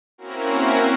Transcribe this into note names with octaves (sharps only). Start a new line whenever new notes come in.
A#3 C4 C#4 E4 F#4 A#4